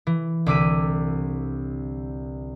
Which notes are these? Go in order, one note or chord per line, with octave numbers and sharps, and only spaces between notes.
E3
C2 D3 D6 E6 B6 D#7